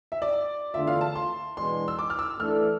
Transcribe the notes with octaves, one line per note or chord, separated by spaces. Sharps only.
E5
D5
E2 D3 A3 D4 F4 E5
F5
A5
C6
E2 B2 G#3 D4 C6
E6
D6
F6
E6
E3 A3 D4 A4 F6